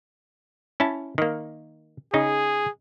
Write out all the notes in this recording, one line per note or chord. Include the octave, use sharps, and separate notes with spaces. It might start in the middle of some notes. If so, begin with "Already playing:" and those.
C#4 E4 A5
D#3 A#3
C#3 D#4 G#4